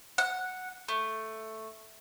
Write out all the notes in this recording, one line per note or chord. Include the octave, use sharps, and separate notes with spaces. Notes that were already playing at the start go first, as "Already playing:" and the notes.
F#5
A3